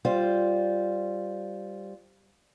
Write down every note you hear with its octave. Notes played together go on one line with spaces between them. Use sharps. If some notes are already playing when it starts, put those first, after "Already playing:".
G3 F4 C5